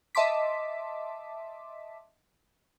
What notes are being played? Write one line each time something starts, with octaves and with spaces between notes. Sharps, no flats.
D#5 E5 A5 C6 D6 B6